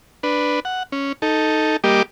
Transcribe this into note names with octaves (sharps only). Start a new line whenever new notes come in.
D4 B4
F#5
C#4
D#4 A4
G3 A#3 G4 D#5 D6